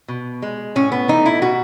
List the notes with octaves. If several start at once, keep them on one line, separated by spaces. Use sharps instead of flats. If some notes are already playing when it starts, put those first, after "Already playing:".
B2
G#3
A2 C#4
B3
E3 A3 D#4
E4
B2 F#4